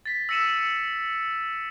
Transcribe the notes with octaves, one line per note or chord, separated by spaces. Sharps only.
A6 B6
E6 A#6 C#7 D#7 E7